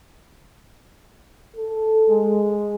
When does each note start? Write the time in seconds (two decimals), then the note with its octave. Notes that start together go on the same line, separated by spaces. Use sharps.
1.56 A4
2.09 G#3